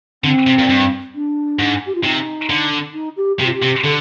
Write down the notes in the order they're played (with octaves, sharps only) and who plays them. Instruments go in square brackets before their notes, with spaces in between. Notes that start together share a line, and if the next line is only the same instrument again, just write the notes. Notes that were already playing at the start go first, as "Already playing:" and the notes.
[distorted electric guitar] D3 [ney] C4
[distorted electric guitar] C3
A#2
G2
[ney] D4
[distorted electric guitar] G#2
[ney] G4
F4
[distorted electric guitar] C3 [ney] D#4
[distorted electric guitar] D3
[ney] D#4
G4
[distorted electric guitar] C3 [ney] G4
[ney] F4
G4
[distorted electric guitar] C3
[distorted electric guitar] D3 [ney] A4